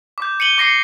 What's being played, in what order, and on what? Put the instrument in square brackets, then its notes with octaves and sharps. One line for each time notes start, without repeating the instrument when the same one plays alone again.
[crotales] D6 G6
C#7 D#7 F#7 G7
D6 A#6 C7 C#7